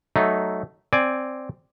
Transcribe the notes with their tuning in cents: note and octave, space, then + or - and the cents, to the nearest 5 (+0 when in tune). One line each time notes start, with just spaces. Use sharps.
F#3 +20 A3 +0 D#4 +0
C4 +0 D5 +0 G#5 +0